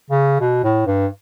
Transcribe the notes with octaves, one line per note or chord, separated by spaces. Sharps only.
C#3
B2
A2
G2